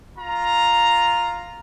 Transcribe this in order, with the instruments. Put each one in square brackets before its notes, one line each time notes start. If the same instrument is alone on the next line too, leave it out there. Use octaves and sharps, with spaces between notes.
[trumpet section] F4 A#5